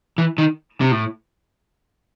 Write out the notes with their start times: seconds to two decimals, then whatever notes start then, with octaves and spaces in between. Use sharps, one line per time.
0.18 E3
0.38 D#3
0.81 C3
0.92 A2